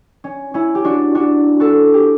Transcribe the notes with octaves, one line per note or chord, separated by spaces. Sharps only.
C#4
C#4 E4
G4
D4 F#4
D4 F#4
F#4 A4
G4